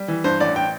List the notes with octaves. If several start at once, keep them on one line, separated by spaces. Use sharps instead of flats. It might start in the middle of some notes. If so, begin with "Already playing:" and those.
Already playing: G3
E3
G2 C5
A1 D5
G5